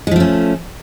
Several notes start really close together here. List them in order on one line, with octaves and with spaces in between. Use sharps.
G#3 F3 A3 C#4